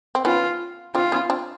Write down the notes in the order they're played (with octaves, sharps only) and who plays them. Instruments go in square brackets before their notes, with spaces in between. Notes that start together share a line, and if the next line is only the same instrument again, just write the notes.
[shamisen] C4
[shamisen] B3 C#4 [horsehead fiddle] F4
[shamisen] C4 D4 [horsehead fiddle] F4
[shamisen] B3 C#4
C4 D4